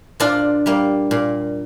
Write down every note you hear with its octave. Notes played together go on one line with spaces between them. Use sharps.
A#2 D4 F4
G3 A#3
A#2